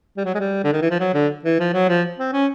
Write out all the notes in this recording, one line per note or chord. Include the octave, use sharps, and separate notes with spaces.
G3
F#3
G#3
G3
D3
D#3
E3
F3
F#3
D3
E3
F3
F#3
F3
C4
C#4